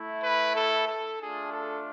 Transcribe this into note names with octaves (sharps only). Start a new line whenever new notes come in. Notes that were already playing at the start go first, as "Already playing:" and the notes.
Already playing: A3 E4
B4
A4
A4
A3 D4 F4 G#4
A4